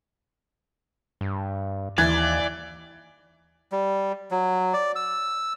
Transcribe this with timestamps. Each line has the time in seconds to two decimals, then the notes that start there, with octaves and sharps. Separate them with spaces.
1.21 G2
1.98 D#2 E3 D5 G#6
3.72 G3
4.31 F#3
4.73 D5
4.96 E6